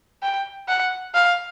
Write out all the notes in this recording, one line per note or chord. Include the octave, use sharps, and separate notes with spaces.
G5
F#5
F5